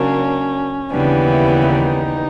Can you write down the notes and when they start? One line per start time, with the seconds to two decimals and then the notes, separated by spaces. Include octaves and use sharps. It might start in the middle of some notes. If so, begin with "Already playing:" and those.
Already playing: C#3 F#3 A#3 C#4 D4
0.91 D#2 C#3 E3 G3 B3 D4
1.31 E4
1.69 D#4